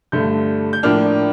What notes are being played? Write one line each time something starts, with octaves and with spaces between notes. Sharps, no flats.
G2 D3 A3 G6
G6
A2 F3 A#3 D4 F6